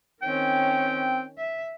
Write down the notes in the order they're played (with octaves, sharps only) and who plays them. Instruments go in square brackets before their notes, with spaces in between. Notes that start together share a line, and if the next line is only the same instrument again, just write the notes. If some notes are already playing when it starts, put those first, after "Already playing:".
[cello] D#3 C#4 [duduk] C4 [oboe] G5
[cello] E5